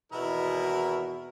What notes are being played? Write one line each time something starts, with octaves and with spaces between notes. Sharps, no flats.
G#1 E2 B2 E4 A#4 B4